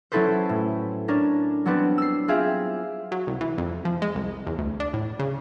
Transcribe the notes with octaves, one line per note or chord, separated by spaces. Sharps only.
F#3 C#4 E4 A4 B4 C5
A2
C#4 D4 A#4
F#3 G3 B3 C4 D4 B4
E6 C7
C4 F4 G4 G#4 E5 F5
F#3
C2
E3
F2
F3
G#3
C2
E2
D2
D4
A2
C#3